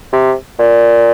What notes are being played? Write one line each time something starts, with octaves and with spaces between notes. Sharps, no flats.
C3
A#2